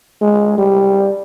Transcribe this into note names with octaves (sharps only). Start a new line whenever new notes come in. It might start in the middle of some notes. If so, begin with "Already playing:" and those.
G#3
G3